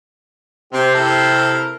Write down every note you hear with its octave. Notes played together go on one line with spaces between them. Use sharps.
C3 C4 G4
E4 A4 A#4